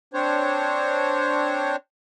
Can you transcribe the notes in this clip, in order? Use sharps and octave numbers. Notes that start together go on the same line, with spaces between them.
C4 D4 C5 C#5